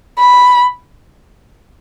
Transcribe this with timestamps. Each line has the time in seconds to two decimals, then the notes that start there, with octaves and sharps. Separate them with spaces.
0.18 B5